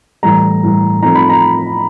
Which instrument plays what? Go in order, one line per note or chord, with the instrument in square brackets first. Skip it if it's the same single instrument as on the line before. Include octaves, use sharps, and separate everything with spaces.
[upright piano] A2 E3 G3 A#5
A2 E3 G3
F3 A3 C4 D#4 A#5
B5
A#5